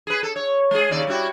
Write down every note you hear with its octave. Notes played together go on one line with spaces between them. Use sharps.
G#4 B4
A4
C#5
G#3 G#4
D#2 C#3 D5
G3 E4 F#4